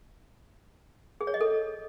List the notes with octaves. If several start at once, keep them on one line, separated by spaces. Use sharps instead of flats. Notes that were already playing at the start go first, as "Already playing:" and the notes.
G#4
C#5
D#5
A4